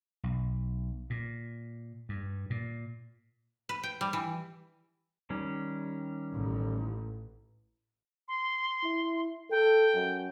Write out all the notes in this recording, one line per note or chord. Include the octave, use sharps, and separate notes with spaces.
B1
A#2
G2
A#2
B4
G5
G3
E3
D#3 G3 C#4
A1
C6
E4
A4 G5
F#2